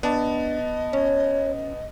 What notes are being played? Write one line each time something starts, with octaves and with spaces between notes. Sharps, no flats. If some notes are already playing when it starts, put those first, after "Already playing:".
B3 D4 D#5 A5
C#4 C#5